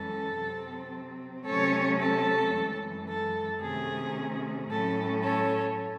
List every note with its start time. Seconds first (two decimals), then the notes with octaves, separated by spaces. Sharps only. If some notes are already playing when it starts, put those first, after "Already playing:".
Already playing: F#2 E3 G#3 C#4 A4
0.37 C3 F#3 C4
1.45 C3 F#3 A3 C#4 A4 C#5
1.99 A4
2.53 F#2 E3 G#3
3.07 A4
3.61 C3 D#3 A3 C#4 G#4
4.70 A2 F#3 A3 C#4 A4
5.23 A4 C#5